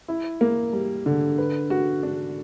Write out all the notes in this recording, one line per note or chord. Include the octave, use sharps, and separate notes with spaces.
E4
A#3
G3
D3
B4
F#4
D4